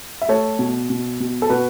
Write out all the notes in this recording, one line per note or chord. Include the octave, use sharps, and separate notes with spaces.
E5
A3 A4 C#5
B2
B2
B2
A4
B2 F#4 B4